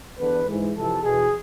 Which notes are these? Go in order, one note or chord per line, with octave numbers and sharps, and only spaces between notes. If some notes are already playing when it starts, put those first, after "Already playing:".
E2 D3 B4
G#2 E3
F2 C3 E3 A4
E2 B2 G#4